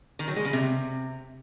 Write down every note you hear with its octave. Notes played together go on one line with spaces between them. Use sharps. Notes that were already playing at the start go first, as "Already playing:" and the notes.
D#3
F#3
G#3
C#3
C3